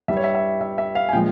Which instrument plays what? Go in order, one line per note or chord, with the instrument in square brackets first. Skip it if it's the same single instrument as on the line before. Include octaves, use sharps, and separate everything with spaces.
[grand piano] G2 G3 E5
C#5
E5
E5
E5
E5
F5
G#5
A#2 F3 G#3 G5